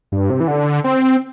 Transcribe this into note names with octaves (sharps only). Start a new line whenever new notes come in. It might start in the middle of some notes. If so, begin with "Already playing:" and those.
G2
C3
E3
D3
C4